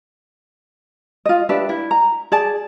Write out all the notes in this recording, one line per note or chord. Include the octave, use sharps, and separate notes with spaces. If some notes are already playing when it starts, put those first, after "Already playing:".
F4 D#5
D4 G4 B4 E5
E4
A#5
G#4 D5 A5